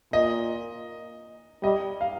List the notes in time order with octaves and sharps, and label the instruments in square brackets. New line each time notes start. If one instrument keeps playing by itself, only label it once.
[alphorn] A#2 [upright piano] D#5
[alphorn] G3 [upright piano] D#5
[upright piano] F5